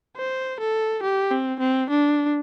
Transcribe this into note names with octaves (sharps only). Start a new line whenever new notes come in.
C5
A4
G4
C4
C4
D4